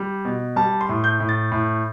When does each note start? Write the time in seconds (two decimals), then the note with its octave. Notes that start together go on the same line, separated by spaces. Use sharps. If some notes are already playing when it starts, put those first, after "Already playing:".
Already playing: G3
0.25 B2
0.56 G3 A5
0.81 C6
0.89 A2
1.04 G6
1.20 A2
1.29 A6
1.52 A2